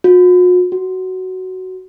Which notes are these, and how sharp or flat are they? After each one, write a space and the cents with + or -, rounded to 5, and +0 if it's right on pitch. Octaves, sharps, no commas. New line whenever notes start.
F#4 -45
F#4 +10